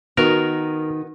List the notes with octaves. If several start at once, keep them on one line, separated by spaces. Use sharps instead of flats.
D#3 B3 F#4 A#4